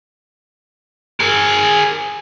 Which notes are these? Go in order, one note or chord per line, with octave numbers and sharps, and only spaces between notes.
G#4 A#4